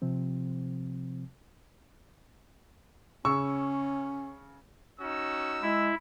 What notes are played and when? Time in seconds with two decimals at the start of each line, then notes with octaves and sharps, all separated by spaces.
0.02 C3 F3 C4
3.25 C#3 C#4 C#6 E6
5.00 C#4 D#4 F#4 E6
5.62 G#3 E4